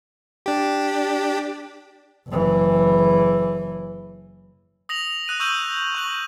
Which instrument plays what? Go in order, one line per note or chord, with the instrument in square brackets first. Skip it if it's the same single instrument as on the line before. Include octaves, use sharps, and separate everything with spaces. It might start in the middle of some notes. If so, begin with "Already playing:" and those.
[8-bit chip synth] D4 G4
[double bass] F#1 E3
[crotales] D#6 A#6 F7 F#7
D#6 F#6 D#7
C#6 D#6 E6 G6 D#7 F#7
C#6 F#6 F#7